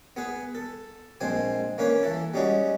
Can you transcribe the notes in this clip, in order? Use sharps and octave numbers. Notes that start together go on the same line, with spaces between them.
B3 G#4 B4
A4
A#1 G#3 C4 C5 G#5
A#3 C#4 B4 C#5
E3 E4 A4
G3 G#3 C#4 D#4 F#4